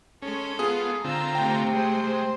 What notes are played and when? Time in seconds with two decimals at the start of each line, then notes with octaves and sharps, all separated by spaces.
0.22 G#3 C#4 A4
0.59 B3 F4 G#4
1.04 D3 C4 F4 A#5 E6
1.35 C3 A3 G5
1.73 G#3 C5
2.04 G#3